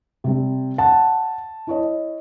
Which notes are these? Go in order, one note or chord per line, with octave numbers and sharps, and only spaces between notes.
C3 G3 C4
F#5 A5
E4 C#5 D#5